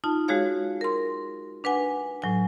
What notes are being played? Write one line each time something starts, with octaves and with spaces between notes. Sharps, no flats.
D#4 F4 A5
G#3 F#4 G#4 C#5 F5
A#4 C6
D4 B4 F#5 G#5
A2 F#3 G#5